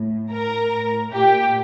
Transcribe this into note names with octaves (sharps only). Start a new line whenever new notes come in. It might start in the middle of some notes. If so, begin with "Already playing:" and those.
Already playing: A2
A2 A#4 A#5
A2
A#2 G4 G5